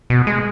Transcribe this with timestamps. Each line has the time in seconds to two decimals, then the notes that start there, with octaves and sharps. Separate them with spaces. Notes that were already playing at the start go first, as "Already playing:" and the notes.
0.10 B2
0.27 G#3